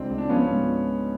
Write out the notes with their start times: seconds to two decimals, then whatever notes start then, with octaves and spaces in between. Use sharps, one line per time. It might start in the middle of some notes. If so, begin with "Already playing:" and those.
Already playing: C#2 C4 D4
0.10 C#2
0.18 D4
0.29 F3 B3 C#4
0.49 G#2